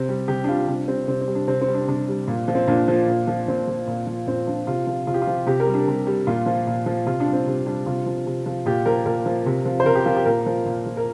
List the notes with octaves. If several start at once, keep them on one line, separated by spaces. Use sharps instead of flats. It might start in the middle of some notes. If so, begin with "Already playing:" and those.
Already playing: C3 C4
G3
C3 G4
D4
G3 F4
C3 D4
G3 C4
C3 C4
C4
G3
D4
C3 C4
C4
G3
D4
C3 D4
G3
A#2
F3
C4
A#2 D4
F3
A#2
F3
A#2 C4
F3
A#2
F3
A#2 C4
F3 D4
C3 F4
F3
C3 F4
G4
F4
F3
C3 G4
A#4
G3
D4
C3
G3
A#2 F4
F3
A#2
F3
C3 F4
D4
G3
C4
C3 D4
G3 D4
C3 F4
F3
C3
F3
A#2 G4
F3 A#4
A#2 A#4
F3
C3
F3
C5
C3 A#4
G4
F3 F4
G4
A#2 A#4
F3
A#2
F3
A#4